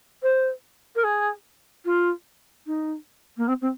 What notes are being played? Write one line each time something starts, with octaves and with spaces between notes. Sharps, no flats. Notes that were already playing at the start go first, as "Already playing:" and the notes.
C5
A#4
G#4
F4
D#4
A#3
C4
C4